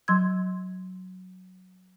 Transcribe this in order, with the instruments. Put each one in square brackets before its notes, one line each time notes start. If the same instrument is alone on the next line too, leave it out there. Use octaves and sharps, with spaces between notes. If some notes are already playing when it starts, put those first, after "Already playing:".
[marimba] F#3 C6 E6 G#6